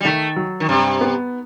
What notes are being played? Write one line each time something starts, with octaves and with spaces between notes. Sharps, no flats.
G3
D#3 A3
F#3
D#3
G2 C3
B3